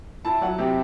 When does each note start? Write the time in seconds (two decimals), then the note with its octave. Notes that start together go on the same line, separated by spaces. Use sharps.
0.25 E4 A5
0.42 F#3 F#5
0.58 C3 G4